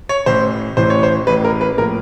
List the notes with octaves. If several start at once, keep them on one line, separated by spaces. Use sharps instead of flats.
C#5
A1 A2 E3 C5
A1 A2 E3 C5
C#5
C5
A1 A2 E3 B4
A#4
B4
A2 F3 A#3 A#4